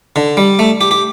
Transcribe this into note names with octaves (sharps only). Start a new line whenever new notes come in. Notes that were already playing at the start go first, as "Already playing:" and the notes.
D3
G3
A3
G4
G4